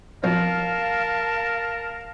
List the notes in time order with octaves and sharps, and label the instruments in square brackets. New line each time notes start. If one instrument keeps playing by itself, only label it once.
[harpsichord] B1 F2 [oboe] A#4 [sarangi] F5 [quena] A5